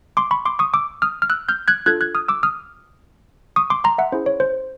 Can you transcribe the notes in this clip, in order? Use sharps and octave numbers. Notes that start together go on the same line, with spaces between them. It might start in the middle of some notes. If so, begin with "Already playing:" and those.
C6 D6
B5 C#6
C6 D6
C#6 D#6
D6 E6
D#6 F6
F6
E6 F#6
F6 G6
F#6 G#6
D4 F4 A4 F#6 G#6
F#6 G#6
D#6 F6
D6 E6
D#6 F6
C#6 D#6
C6 D6
A#5 C6
E5 F#5
C#4 E4 G#4 C5
C#5
C5